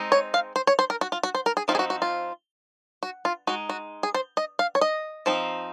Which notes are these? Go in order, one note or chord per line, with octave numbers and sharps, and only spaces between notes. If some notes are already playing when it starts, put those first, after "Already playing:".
Already playing: G#3 C4 D#4
C#5
F5
C5
C#5
C5
A#4
F#4
F4
F#4
C5
A#4
G#4
F3 C4 D#4 F4
G#4
F#4
F#4
F4
F#4
F4
G#3 D#4 F#4
F#4
G#4
C5
D#5
F5
C#5
D#5
F3 C4 D#4